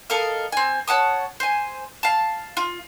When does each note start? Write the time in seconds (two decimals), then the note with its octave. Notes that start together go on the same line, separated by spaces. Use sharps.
0.10 A4 A#4 D#5 F5
0.52 C4 G#5
0.88 C#5 F#5 A5 D#6
1.40 C5 G#5
2.03 F5 A5
2.57 F4